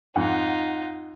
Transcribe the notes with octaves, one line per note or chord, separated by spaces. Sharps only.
F2 G#2 D#4 F4 F#5